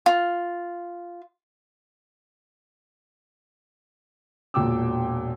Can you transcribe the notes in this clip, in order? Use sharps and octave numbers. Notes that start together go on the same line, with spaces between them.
F4
E1 A#2 G5 D6 E6